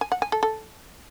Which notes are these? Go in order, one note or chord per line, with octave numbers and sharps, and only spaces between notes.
G#5
F#5
G#5
A4
A4